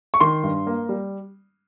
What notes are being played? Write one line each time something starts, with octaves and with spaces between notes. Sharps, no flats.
C#6
D#3 C6
G2
A#3
G3